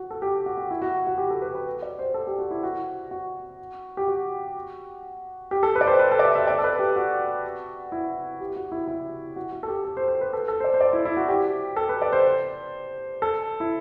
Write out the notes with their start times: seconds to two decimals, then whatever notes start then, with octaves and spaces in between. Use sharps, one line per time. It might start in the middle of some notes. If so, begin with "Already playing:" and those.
Already playing: F#4
0.11 A4
0.22 G4
0.46 F#4
0.58 F#4
0.71 E4
0.82 F#4
1.07 F#4
1.18 G4
1.30 A4
1.42 B4
1.55 B4
1.82 D5
1.99 C5
2.14 A4
2.27 G4
2.39 F#4
2.51 E4
2.63 F#4
3.11 F#4
3.97 G4
4.08 F#4
5.51 G4
5.63 A4
5.75 B4
5.81 D5
5.87 C5
5.99 B4
6.12 A4
6.19 D5
6.24 E5
6.35 E5
6.47 D5
6.59 A4
6.64 B4
6.79 G4
6.96 F#4
7.92 E4
8.40 G4
8.56 F#4
8.72 E4
8.88 E4
9.36 F#4
9.52 F#4
9.63 A4
9.68 G4
9.85 A4
9.97 C5
10.08 C5
10.21 B4
10.33 A4
10.48 A4
10.60 C5
10.64 D5
10.74 C5
10.81 D5
10.93 E4
11.05 E4
11.17 F#4
11.28 G4
11.76 A4
11.89 B4
12.02 D5
12.13 C5
13.22 A4
13.60 E4